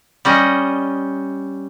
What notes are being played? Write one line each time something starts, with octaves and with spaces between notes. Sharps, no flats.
G3 C#4 D#5